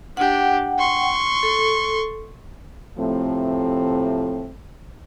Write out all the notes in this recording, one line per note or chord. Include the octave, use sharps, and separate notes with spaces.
D4 G4 F#5 G5
C6 C#6
A4
A2 C3 F3 A3 C4